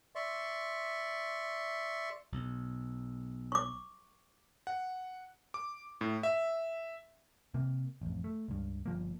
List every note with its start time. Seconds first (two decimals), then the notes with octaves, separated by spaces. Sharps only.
0.15 D5 E5 C6 C#6
2.32 B1
3.52 C#6 D6
4.67 F#5
5.54 D6
6.01 A2
6.23 E5
7.54 C3 A#3
8.01 A1 F2
8.24 A3
8.48 C#2 G2
8.86 G1 F3 A#3